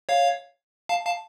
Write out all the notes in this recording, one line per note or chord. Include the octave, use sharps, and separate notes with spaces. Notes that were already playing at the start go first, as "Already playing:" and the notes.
C#5 F5
F5 A5
F5 A5